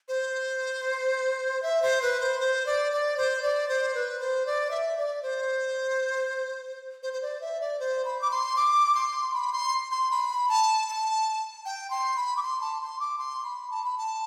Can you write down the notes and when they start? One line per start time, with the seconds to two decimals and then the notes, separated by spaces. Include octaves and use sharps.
0.08 C5
1.63 E5
1.82 C5
2.02 B4
2.20 C5
2.40 C5
2.66 D5
2.92 D5
3.17 C5
3.42 D5
3.69 C5
3.95 B4
4.20 C5
4.46 D5
4.71 E5
4.97 D5
5.23 C5
7.03 C5
7.13 C5
7.22 D5
7.41 E5
7.61 D5
7.80 C5
8.05 B5
8.21 D6
8.32 C6
8.56 D6
8.95 C6
9.34 B5
9.53 C6
9.92 C6
10.11 B5
10.49 A5
10.88 A5
11.65 G5
11.90 C6
12.17 B5
12.37 D6
12.43 C6
12.61 A5
12.81 C6
13.00 D6
13.19 C6
13.45 B5
13.71 A5
13.84 B5
13.98 A5